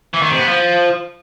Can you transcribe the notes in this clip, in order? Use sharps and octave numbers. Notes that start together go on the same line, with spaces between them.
E3
D#3
C3
B3
F3